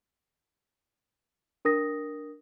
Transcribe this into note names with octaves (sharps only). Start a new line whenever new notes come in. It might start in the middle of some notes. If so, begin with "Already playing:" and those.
D4 A#4 D#6 A#6